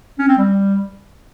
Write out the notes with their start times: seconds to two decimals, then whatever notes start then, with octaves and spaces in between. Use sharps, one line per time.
0.19 C#4
0.28 C4
0.38 G3